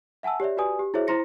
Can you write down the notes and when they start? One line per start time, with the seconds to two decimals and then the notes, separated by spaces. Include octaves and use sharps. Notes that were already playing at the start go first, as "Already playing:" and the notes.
0.23 E5 F#5 G#5 A5 E6
0.40 G4 C#5 D5 E5
0.57 F#4 G4 B4 D5 G#5 D#6
0.79 G4
0.94 E4 F#4 G#4 C5 C#5 E5
1.07 E4 C5 A#5 C6 A#6 C#7